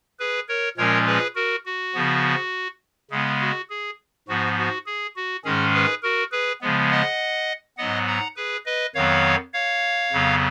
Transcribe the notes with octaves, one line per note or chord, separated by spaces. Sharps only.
G#4 B4
A#4 C#5
A#2 F3 G#3 C#4 A#4 C#5
G#4 B4
F#4 A#4
F#4
C#3 F3 B3
C#3 G#3 B3 G#4
F#4
G#4
G#2 F3 B3 F#4
F#4
G#4
F#4
G#2 D#3 G#3 C#4 G#4
G#4 B4
F#4 A#4
G#4 B4
C#3 F3 G#3 B3
D#5 F#5
G#2 F#3 B3 D#5 F#5
F#5 A#5
G#4 B4
B4 D#5
F2 D#3 F#3 B3 C#5 F5
C#5 F5
F2 C#3 F#3 B3